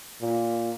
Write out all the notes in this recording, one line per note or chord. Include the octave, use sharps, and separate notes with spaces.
A#2